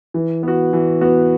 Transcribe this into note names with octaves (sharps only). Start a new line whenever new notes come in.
E3
B3 F#4
E3
B3 F#4